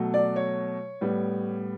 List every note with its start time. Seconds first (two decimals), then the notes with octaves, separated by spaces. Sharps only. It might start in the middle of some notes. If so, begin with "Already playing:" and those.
Already playing: B2 F#3 A3
0.14 D5
0.36 C#5
1.01 A2 G3 B3